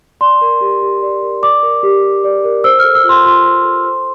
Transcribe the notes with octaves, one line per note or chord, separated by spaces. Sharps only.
D5 C6
A#4
G4
G4
D5
A#4
D5 D6
A#4
G4
G4
D5
A#4
C5 E6
A4 F6
E6
F4
C6
F4 C6
C5
A4
C5